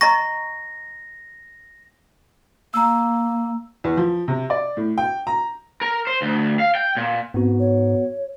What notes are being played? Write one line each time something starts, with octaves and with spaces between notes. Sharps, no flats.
D#5 A#5 C#6 A#6
A#3 A#5 E6
E2
F3
C3
D5
A2
G5
A#5
A#4
C5
D2
F5
G5
A#2
G#2 B3 C4 F#4
C#5